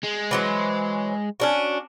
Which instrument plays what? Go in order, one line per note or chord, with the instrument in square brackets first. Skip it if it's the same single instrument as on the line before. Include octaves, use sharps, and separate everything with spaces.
[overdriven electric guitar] G#3
[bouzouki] E3 F#3 C5
C#4 D4 F#4